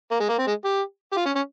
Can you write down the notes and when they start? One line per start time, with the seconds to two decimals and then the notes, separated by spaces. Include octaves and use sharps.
0.11 A#3
0.20 G#3
0.29 A#3
0.38 C4
0.47 G#3
0.65 G4
1.12 G4
1.17 F4
1.25 C#4
1.35 C#4